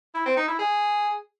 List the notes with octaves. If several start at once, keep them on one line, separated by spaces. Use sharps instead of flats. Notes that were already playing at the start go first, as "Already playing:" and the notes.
E4
C4
D#4
E4
G#4